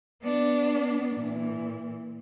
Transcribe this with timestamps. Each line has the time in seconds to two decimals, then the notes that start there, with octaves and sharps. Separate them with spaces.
0.23 B3 D4
1.16 A#2 E3